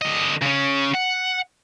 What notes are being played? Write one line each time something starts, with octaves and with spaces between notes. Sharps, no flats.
D3 D#5
C#3 C#4
F#5